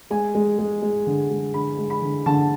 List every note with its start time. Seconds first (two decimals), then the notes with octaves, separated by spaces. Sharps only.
0.10 G#3 G#5
0.35 G#3
0.59 G#3
0.82 G#3
1.07 D3
1.30 G#3
1.54 D3 B5
1.78 G#3
1.90 B5
2.02 D3
2.26 D3 A5